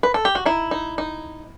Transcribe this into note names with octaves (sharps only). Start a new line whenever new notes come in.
B4
A4
G4
F#4
D#4 E4
D#4
D#4